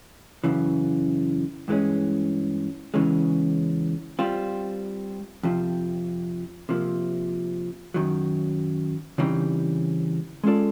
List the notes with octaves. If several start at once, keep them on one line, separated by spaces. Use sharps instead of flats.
F#2 C#3 E3
G2 E3 G#3 C#4
E2 C#3 E3 G#3 C#4
G3 C4 F4
F2 C3 F3
C3 F3 A#3
F#2 D#3 F#3
C#3 E3 G3 C4 D#4
G#3 C#4 F4 A4 D5